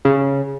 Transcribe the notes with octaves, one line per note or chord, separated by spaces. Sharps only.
C#3